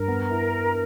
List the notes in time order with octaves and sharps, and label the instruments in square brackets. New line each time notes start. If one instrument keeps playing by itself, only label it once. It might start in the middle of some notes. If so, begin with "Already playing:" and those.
Already playing: [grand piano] G2 [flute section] A#4
[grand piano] B3
E4